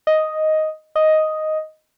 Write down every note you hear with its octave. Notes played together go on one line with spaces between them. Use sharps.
D#5
D#5